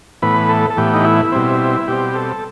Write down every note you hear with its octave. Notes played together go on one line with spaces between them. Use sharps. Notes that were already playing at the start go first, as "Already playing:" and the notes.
A2 E3 B3 B4
A4
A4
A2 E3 B3 G4
D#4
E4
B2 G3 C4
B2 G3 C4 G4
A4